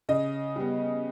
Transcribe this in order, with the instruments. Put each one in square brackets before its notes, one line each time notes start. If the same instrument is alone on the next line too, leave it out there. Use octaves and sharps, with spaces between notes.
[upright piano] C#3 D#5
G3 B3